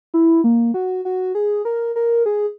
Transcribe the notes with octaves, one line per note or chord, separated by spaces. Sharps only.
E4
A#3
F#4
F#4
G#4
A#4
A#4
G#4